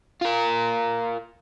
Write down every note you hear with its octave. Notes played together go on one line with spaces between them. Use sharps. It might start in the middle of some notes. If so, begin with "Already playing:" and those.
F4 A#4